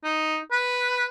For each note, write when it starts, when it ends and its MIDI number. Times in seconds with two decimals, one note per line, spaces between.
0.04 0.38 63
0.52 1.06 71